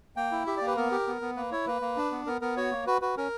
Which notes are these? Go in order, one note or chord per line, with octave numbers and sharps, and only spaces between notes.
A#3 G5
E4
G4 E5
D5
A#3
B4
B3 A#4
G4
B3
B3
A#3 B4
E4 C#5
A#3 B4
A#3
D4
B3
B3 A#4
B3 A#4
F#4 C#5
A#3
F#4 B4
F#4 B4
C#4 A#4